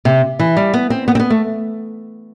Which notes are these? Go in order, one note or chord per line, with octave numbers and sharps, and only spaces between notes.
C3
E3
G3
B3
C4
B3
C4
B3
A3